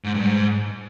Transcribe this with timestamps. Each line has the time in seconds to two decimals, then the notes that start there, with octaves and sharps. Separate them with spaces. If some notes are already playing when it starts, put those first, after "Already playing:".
0.04 G#2
0.14 G2
0.24 G#2